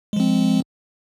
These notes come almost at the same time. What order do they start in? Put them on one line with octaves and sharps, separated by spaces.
G#3 F3 C4